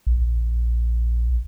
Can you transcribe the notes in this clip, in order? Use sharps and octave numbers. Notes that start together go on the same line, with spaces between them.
A#1